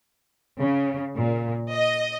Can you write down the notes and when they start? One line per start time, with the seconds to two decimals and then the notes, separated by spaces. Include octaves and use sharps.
0.60 C#3
1.16 A#2
1.73 D#5